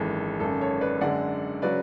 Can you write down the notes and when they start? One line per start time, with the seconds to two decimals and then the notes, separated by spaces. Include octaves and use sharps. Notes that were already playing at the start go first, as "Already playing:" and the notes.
Already playing: G#1 F#2 E3 G#3 A4
0.40 G#1 F#2 C#3 A4
0.60 A4 C#5
0.81 B4 D5
1.01 F#2 D3 G#3 D5 F#5
1.62 C#3 F#3 B4 D5